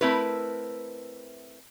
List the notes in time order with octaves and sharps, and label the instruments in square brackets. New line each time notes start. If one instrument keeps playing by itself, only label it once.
[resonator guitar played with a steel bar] A3 C4 E4 A#4 B4